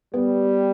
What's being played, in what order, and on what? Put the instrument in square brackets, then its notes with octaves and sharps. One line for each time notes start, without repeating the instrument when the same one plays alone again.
[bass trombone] G3 [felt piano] B3